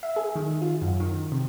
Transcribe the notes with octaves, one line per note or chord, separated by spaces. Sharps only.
E5
G#4
D#3
F4
F#2
D#3
C3